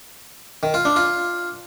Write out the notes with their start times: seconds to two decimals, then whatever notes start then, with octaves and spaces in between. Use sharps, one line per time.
0.63 D#3
0.74 F4
0.85 D4
0.96 F4